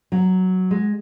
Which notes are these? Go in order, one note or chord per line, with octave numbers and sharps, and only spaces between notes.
F#3
G#3